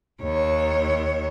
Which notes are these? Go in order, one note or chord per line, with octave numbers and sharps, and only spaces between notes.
D#2 C#5